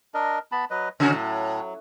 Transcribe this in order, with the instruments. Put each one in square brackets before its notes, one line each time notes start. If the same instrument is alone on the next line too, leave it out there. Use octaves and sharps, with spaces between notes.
[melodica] D4 A#4 D#5
B3 A5 B5
F#3 B4 D#5
[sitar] C#3 C#4 F#4 [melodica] F#3
[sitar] A2